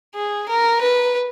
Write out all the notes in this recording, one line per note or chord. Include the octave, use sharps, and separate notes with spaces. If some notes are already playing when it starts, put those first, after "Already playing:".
G#4
A#4
B4